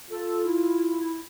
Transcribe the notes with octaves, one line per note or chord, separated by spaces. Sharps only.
F4 A4
E4